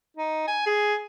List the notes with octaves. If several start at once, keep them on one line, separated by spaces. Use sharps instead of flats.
D#4
G#5
G#4